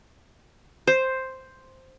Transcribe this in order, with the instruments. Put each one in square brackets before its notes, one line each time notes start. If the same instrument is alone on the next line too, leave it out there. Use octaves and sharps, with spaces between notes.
[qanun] C5